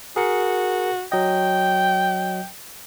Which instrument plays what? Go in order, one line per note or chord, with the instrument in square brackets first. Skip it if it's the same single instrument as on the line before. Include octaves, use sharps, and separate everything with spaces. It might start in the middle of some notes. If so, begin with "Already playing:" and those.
[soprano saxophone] F#4 [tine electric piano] G#4 A#4 C#7
[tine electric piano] F#3 D#5 [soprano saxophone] G5